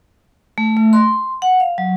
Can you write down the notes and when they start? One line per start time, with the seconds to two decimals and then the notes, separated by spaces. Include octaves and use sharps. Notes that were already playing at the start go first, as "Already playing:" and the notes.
0.58 A3
0.77 A3
0.93 C6
1.42 F#5
1.60 F5
1.78 F#3